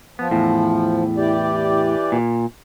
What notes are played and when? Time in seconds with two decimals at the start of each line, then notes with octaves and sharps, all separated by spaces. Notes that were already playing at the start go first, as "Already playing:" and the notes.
0.19 F3 B3
0.31 E2 A2
1.17 E3 G4 D5
2.12 A#2